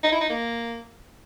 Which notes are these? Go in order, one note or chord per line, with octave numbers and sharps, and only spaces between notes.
D#4
E4
D#4
A#3